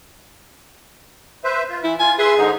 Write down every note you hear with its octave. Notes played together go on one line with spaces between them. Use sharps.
B4 C5 E5
F4
E3 E4
F4 G#5
G#4 B4 E5 C6
G#2 D3 D#4